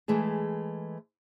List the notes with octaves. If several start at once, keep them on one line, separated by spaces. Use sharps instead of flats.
E3 G#3 A3 G#4